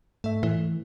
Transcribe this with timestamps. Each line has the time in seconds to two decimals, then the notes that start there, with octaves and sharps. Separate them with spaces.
0.24 G#2 A3 E5
0.43 A2 E3 A3